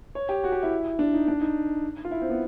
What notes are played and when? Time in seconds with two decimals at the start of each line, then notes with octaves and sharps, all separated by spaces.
0.15 C#5
0.29 G4
0.44 F#4
0.52 G4
0.63 E4
0.99 D4
1.14 D#4
1.28 D4
1.41 D#4
2.05 F4
2.11 E4
2.22 C4
2.30 B3